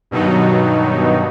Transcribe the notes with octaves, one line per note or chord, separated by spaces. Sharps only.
G2 B2 D#3 F#3 D#4